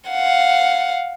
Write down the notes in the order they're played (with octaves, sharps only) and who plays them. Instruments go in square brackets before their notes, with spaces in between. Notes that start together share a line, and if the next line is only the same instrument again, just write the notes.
[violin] F5 F#5